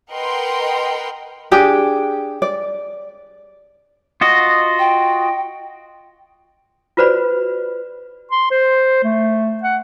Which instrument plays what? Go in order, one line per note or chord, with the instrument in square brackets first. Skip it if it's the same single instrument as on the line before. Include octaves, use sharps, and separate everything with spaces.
[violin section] A#4 B4 D#5 F#5 G5 C6
[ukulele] D4 G4 G#4 G5
D5
[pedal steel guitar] F4 F#4 D#5
[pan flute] G5
[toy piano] F4 F#4 B4 C5 D5 B5
[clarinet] C6
C5
A3
F#5